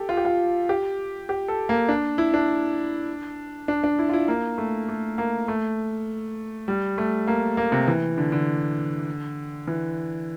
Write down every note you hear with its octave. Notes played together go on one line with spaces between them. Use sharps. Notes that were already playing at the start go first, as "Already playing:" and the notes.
Already playing: G4 A4
F4
G4
F4
G4
G4
A4
A#3
D4
E4
D4
D4
D4
E4
F4
E4
A#3
A3
A3
A#3
A3
G3
A3
A#3
A#3
C3
E3
D3
D3
E3